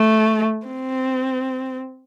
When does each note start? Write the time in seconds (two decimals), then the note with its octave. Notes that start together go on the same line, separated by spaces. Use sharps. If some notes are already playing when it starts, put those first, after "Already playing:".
Already playing: A3
0.66 C4